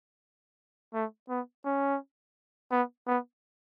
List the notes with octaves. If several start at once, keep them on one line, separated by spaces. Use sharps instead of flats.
A3
B3
C#4
B3
B3